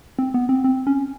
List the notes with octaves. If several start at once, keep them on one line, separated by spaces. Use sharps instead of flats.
C4
B3
C4
C4
C#4